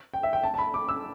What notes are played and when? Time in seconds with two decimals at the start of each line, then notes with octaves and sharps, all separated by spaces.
0.14 G5
0.23 E5
0.33 G5
0.43 A5
0.54 A5
0.58 B5
0.74 D6
0.89 E6